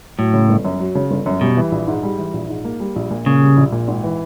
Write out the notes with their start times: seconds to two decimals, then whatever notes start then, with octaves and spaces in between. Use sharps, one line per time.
0.18 A2 F#3
0.33 C#3
0.49 G1
0.65 F#2
0.80 F#3
0.95 C#3
1.11 G1
1.26 F#2
1.41 B2 G3
1.57 E3
1.72 A#1
1.87 G#2
2.03 G3
2.18 E3
2.34 A#1
2.49 G#2
2.64 A#3
2.80 G3
2.96 A#1
3.11 A#2
3.26 C#3 A#3
3.41 G3
3.57 A#1
3.72 A#2
3.88 G#1
4.04 E3